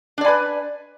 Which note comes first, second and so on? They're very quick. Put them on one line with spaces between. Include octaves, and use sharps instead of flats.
D4 D5 G#5 B4